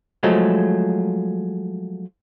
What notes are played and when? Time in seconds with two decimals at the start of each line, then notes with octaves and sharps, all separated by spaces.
0.23 F3 F#3 G#3 A3